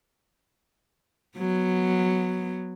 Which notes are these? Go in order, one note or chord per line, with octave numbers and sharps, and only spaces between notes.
F#3 B3